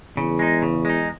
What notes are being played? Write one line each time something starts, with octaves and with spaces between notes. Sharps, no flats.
E2 C#3
G#3 D#4
C#3
G#3 D#4